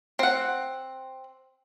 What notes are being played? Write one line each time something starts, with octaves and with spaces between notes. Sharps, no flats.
C4 F#5